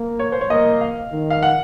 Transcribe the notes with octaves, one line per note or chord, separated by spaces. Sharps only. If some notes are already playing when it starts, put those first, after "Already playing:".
Already playing: A#3
C#5
C5
C#5
A#3 D#5
F5
D#3
F5
F#5